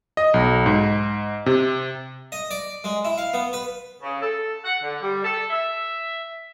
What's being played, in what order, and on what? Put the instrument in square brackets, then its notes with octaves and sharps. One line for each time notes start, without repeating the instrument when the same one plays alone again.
[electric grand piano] D#5
B1
G#2
C3
[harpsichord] D#5
D5
G#3
E4
F5
B3
B4
[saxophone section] C#3
A4
F#5
D3
G3
A4
E5